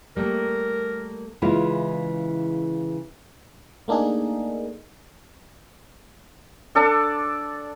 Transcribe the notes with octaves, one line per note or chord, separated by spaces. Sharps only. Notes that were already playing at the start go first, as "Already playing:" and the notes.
G3 A3 A#3 A#4
C#3 E3 G#3 E4 F4
A3 A#3 D4 D#4 G#4
D4 A4 D5 A5